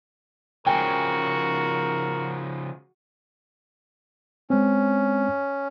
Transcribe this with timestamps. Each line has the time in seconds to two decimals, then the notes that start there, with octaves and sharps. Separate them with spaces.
0.66 C#3 F3 F#4 A#4 G5 G#5
4.50 G#3 C4 C#4